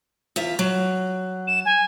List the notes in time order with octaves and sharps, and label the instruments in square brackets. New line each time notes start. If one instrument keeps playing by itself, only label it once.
[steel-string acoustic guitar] E2 F4 E5
F#3
[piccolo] E7
G#5